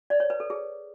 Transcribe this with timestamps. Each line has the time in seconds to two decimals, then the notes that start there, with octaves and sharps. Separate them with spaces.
0.10 D5
0.20 C#5
0.30 B4
0.40 A4
0.50 G#4